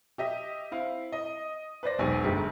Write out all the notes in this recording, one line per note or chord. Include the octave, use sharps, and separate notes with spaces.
G4 D#5 E5
C4 E4 F5
D#5
B4 C5 D5 A#6
E1 B1 B2 C4 G4 G#5
G1 D2 G#3 G4